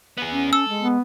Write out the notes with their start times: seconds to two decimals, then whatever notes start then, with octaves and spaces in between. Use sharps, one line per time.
0.17 B3 G#4
0.32 C#4
0.53 A4 E6
0.69 G#3
0.81 B3